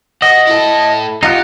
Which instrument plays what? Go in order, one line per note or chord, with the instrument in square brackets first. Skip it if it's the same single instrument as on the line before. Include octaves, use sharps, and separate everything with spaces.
[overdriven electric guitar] F#4 [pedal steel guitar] D#5
[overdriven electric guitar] E4 A4
[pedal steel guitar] D#4 F4 F#5 [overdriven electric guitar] G4